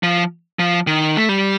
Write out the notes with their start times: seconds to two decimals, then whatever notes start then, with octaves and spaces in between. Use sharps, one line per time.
0.03 F3
0.59 F3
0.87 D#3
1.17 A3
1.29 G3